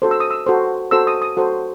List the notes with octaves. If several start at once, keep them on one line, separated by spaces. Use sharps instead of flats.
F#4 A4 C5
E6
D#6
E6
F#4 A4 C5
F#4 A4 C5 E6
D#6
D#6
F#4 A4 C5